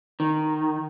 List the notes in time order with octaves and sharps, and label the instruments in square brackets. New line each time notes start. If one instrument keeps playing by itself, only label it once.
[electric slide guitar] D#3